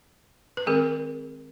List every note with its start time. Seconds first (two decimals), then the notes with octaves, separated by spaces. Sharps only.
0.57 B4
0.66 D#3 G#3 C4 G#4 A#4